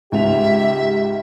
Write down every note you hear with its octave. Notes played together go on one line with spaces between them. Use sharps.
C#2 G#2 G4 E5 F7